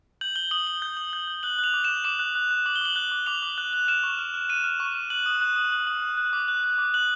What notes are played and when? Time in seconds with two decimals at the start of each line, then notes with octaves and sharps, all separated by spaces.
0.21 G6 F#7
0.36 G6 G7
0.51 D#6 F#7
0.67 D#6 G7
0.82 G6
0.97 D#6
1.13 G6
1.27 G6
1.43 F#6 F#7
1.59 F#6
1.64 F7
1.74 D6
1.84 E7
1.89 D6
2.04 D6 E7
2.19 F#6
2.35 F#6
2.51 F#6
2.66 D6 F#7
2.76 G7
2.81 D6 F#7
2.96 F#6
3.12 D6
3.26 D6 F7
3.42 D6
3.58 F#6
3.73 F#6
3.88 F6 E7
4.03 C#6
4.19 F6
4.34 F6
4.49 F6 D#7
4.64 F6
4.80 C#6
4.95 F6
5.10 F#6 F#7
5.26 D#6
5.41 F#6
5.56 D#6
5.72 F#6
5.87 D#6
6.02 F#6
6.17 F#6
6.33 D6
6.48 F#6
6.64 F#6
6.78 D6
6.94 F#6 F#7